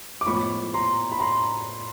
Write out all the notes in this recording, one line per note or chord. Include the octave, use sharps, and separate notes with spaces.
D6
A2 F3 G#3 B3 B5 C#6
A#5 C6
B5
A#5 C6